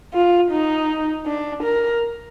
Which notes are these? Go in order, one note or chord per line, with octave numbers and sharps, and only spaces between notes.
F4
D#4
D4
A#4